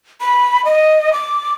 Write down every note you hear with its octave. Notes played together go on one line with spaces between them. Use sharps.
B5
D#5
D6